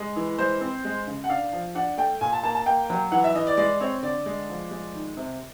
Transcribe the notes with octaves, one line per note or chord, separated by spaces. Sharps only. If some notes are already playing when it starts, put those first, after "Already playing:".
Already playing: G#3
E3
G#3 C5
C4
G#3
C#3
F#5
D4 F5
F3
D4 F#5
A3 G5
A#2 G#5
A5
A#3 A5
A5
A#3 G5
F#3
E3 F#5
E5
E3 D#5
D5
G#3 D5
C4 C#5
D3 D5
G#3
F3
G#3
D#3
C3